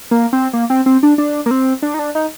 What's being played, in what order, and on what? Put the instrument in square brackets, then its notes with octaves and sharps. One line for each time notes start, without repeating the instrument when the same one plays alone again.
[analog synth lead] A#3
C4
A#3
C4
C4
D4
D4
A#3
C4
D4
D#4
D4
D#4